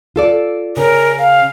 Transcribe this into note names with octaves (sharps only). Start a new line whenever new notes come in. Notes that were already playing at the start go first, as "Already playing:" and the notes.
F4 A4 D5
C#3 A#4
F5